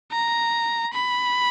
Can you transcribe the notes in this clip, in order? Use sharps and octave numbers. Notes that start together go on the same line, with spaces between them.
A#5
B5